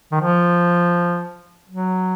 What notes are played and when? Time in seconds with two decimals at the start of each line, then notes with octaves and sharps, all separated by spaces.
0.12 D#3
0.21 F3
1.69 F#3